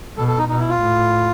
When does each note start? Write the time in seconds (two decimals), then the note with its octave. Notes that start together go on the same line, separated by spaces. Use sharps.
0.17 B2 A4
0.28 A4
0.38 D#4
0.49 B2 D#4
0.59 E4
0.69 F4
0.80 A2